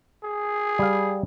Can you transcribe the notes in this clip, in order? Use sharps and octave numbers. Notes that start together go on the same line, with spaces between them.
G#4
G3 F5